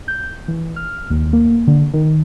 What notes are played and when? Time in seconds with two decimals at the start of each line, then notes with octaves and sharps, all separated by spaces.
0.08 G6
0.48 E3
0.76 F6
1.10 D#2
1.33 A#3
1.67 D3
1.94 D#3